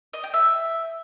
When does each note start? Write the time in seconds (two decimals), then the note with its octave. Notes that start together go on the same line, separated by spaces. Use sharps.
0.13 D#5
0.24 G5
0.34 E5